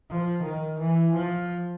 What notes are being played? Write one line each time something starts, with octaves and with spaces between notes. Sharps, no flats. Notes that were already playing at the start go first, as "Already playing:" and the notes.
F3
D#3
E3
F3